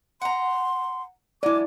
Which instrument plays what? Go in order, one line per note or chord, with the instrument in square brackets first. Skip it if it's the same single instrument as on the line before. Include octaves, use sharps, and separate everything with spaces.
[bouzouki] F#5 A#5 [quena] C6
[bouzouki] F#3 G#3 [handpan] E4 D5 [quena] D6